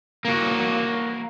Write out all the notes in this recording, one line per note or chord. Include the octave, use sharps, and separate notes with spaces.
A#3 F#4